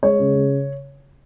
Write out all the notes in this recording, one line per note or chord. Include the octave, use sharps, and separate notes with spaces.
G#3 C#5
C#3
C#3